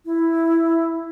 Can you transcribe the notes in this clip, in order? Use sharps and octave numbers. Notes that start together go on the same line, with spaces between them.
E4